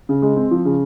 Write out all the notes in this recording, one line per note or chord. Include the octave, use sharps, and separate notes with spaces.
C#3
G#3
C4
F3
C#3